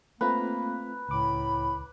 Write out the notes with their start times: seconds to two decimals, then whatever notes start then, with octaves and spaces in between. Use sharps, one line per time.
0.21 A3 A#3 C4 F4 B4 A#5
1.09 C#2 A2 B5 D6